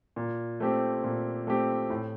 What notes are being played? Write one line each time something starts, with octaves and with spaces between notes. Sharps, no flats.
A#2
A3 C4 G4
A#2
A3 C4 G4
A2